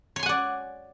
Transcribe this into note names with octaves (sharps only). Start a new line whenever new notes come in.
C#5 D5 F#5 G#5 C6